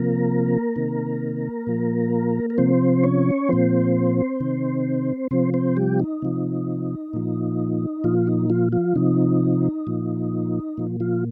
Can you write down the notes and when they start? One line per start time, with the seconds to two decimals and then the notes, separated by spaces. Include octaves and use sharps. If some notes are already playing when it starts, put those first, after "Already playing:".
Already playing: C3 F3 A#3 A#4
0.76 C3 D#3
1.67 A#2 F3
2.50 A#4
2.58 C3 F3 C4 C5
3.03 C#4 C#5
3.49 A#2 F3 C4 C5
4.40 C3 D#3
5.31 C3 F3 C4 C5
5.54 C4 C5
5.76 G3 G4
6.00 D#4
6.22 C3 F3
7.13 A#2 F3
8.04 A#2 F3 F4
8.27 D#4
8.50 F3 F4
8.72 F3 F4
8.96 C3 F3 D#4
9.87 A#2 F3
10.77 A#2 F3
11.00 F3 F4